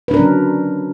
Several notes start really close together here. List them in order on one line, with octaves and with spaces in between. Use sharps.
B4 D4 A#4 C#4 F#3